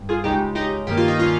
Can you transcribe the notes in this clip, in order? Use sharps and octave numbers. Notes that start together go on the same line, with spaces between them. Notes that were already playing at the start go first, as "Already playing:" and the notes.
Already playing: G2
F4 G#4
C#2 C#3 G#3 D#4 G4
D#4 G4
G2 D#3 A#3 G4
F4
D#4
C#4 F4